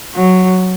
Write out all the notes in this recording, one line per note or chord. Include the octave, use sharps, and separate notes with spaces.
F#3